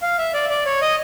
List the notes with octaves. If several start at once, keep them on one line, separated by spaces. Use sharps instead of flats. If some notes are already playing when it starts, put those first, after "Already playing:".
F5
E5
D5
D5
C#5
D#5